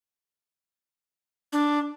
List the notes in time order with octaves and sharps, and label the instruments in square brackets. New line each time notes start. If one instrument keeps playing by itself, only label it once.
[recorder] D4